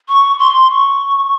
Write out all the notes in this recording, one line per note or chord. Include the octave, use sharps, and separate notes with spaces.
C#6
C6
C#6